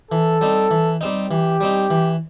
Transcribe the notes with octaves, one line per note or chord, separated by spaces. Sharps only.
E3 A4
G3 C4 D#4
E3
G3 C4 D#4
E3 G4
G3 C4 D#4
E3